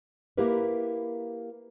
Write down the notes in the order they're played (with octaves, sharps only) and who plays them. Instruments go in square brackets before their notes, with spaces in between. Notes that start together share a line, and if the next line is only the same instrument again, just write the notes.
[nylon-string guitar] A#3 E4 G4 A#4 B4